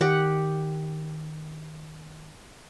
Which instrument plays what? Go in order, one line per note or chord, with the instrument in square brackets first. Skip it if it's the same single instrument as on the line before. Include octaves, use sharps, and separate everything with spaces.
[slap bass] D#3 [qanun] G4 F#5